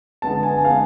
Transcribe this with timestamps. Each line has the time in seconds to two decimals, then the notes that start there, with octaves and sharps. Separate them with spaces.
0.22 D3 G#3 B3 A5
0.43 G#5
0.65 D3 G#3 B3 F5